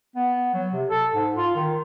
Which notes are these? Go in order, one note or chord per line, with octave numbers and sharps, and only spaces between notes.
B3
F#3
C3
A4
G#2
F4
D#3